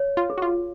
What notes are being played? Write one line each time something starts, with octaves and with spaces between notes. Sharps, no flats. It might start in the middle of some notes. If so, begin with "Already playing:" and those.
Already playing: C#5
F4
G#4
F#4
F4